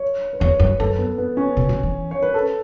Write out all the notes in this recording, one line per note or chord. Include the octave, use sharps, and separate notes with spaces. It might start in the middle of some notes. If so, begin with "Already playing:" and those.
Already playing: C#5
B4
E2 C#5
F#2 B4
F#2 A4
B3
B3
C#4
B2
B2
E3
C#5
B4
A4